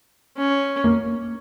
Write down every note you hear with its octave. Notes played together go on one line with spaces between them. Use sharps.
C#4
A#3